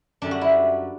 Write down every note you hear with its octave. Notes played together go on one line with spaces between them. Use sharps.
F#2 D3 G3 D4
F#4
E4